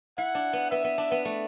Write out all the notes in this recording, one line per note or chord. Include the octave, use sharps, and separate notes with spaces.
E4 F#5
D4
B3
B3 E5
B3
D4
B3
A3